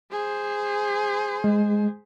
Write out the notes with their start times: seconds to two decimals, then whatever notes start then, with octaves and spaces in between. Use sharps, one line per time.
0.12 G#4 C5
1.44 G#3